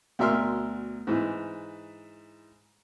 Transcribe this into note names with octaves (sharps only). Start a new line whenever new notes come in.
D2 B2 A#4 E5 C6 F6
G#2 E3